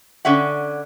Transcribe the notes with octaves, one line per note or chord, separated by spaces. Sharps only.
D3 C#4 E5 F#5